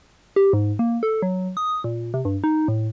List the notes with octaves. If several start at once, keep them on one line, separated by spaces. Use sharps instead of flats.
G4
G#2
A#3
A4
F#3
D#6
A#2
C3
G2
D#4
A2